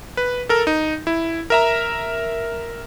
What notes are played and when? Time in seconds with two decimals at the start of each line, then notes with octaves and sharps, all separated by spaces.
0.17 B4
0.49 A4 A#4
0.67 D#4
1.07 E4
1.50 A#4 E5 A#5